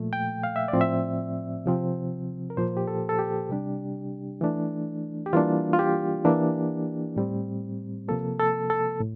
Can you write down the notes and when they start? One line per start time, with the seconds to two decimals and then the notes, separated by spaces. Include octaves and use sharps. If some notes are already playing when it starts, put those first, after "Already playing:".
Already playing: A#2 F3 A3
0.13 G5
0.44 F5
0.56 E5
0.68 D5
0.73 A2 F3 C4
0.81 E5
1.66 C3 F3 C4
2.50 A#4
2.57 A#2 F3 A#3 C5
2.77 G4
2.88 A4
3.09 A4
3.19 G4
3.50 C3 G3 D4
4.41 E3 A3 D4
5.26 G4
5.33 E3 G3 A#3 D4 F4
5.73 F4
5.79 G4
6.25 E3 A#3 D4
7.16 A2 G3 C4
8.08 C3 F3 A#3 A4
8.40 A4
8.70 A4
9.00 A2